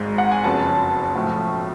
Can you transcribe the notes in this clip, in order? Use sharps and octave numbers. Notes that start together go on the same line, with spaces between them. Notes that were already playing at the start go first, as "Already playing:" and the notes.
Already playing: G#1 G#2 G#3
F#5
G#5
F#1 F2 C#3 F#3 B3 A5
B1 A2 F3 A3